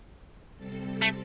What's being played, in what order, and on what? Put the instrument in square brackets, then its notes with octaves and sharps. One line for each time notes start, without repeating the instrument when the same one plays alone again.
[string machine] C3 G3 C4 A4
[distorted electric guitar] A3